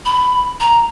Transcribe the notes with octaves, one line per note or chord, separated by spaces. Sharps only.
B5
A#5